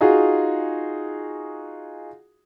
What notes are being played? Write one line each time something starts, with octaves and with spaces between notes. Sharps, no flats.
D#4 F4 F#4 G#4